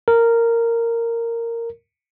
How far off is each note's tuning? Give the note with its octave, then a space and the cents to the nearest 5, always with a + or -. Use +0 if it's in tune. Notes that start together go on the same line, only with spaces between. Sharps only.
A#4 -10